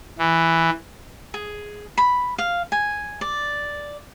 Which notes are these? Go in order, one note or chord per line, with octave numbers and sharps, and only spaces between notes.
E3
G#4
B5
F5
G#5
D5